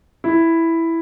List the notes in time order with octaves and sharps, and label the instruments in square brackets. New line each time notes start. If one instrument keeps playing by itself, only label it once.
[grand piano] E4